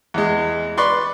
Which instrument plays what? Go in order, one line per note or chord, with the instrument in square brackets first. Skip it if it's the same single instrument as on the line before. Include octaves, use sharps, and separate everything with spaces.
[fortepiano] E2 G#3
B4 D5 C6 C#6